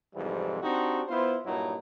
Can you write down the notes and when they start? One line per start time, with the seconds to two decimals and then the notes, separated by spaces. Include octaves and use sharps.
0.14 C2 F2 G#2 E3 G3
0.62 C4 D4 D#4 F#4 G4
1.08 B3 E4 F4 C5
1.45 G2 A#2 F#3 D#4 E4